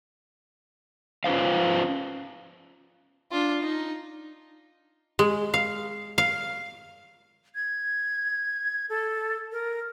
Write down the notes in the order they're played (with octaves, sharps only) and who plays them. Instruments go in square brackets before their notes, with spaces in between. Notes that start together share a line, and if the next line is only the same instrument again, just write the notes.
[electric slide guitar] C#4 F4 B4 C5 F5
[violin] D4 F4
D#4
[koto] G#3
F5
F5
[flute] G#6
A4
A#4